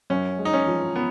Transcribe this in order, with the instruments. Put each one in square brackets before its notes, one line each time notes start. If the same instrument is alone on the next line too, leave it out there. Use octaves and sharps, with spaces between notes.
[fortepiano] F#2 [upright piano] C#4
[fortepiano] G#3
[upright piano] D#4
C#4
[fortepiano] F3
[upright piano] B3